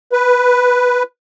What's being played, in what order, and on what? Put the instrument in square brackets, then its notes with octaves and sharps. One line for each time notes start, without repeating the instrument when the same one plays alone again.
[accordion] B4